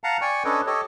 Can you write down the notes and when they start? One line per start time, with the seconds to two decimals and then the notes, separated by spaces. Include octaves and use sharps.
0.04 F5 F#5 A5 A#5
0.21 D5 G5 G#5 C#6
0.45 C#4 D4 A4 B4 C#5 D#5
0.66 G4 A4 C#5 D#5